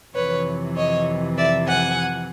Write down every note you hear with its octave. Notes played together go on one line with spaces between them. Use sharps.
F2 C3 E3 B4 C#5
C#5 D#5
D5 E5
F#5 G#5